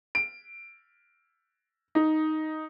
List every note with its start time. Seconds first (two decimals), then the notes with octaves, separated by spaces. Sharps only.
0.15 D7
1.95 D#4